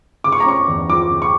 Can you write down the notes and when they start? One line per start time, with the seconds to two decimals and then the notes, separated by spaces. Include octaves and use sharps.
0.24 C#3 D6
0.32 C#6
0.40 A#5
0.46 C#4 C#6
0.68 E2
0.89 F3 D6
1.11 C#3
1.22 C#6